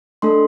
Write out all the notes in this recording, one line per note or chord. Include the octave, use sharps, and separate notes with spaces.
A3 D4 A4 C6